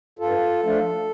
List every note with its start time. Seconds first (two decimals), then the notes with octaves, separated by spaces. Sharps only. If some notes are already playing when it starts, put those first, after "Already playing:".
0.19 G2 F4 A4
0.63 F3 A3 D4 F4